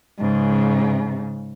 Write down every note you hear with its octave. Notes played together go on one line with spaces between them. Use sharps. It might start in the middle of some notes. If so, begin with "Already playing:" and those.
G#2 C#3